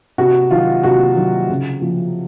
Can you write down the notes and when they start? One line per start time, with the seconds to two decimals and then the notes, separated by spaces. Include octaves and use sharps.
0.18 C3 F#4
0.51 D#3 F#3 F4
0.84 C3 F#4
1.16 D#3 F#3
1.49 C#3
1.81 F3